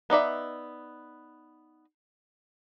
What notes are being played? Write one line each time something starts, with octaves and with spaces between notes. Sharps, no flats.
B3 D#4 D5 E5